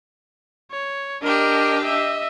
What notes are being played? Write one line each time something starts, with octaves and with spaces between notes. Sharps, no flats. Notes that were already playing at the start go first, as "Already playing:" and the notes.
C#5
D4 G4 A#4 D#5
D#5 E5